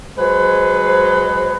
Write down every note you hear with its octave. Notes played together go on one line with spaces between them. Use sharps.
F#3 G#3 B4 C5